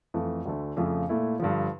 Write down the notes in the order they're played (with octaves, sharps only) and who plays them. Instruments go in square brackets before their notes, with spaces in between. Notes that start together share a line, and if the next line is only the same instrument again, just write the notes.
[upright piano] F2 E3 A3
D2 D3 A3
F2 C#3 F3 A3
A#2 A3 E4
G2 D3 F3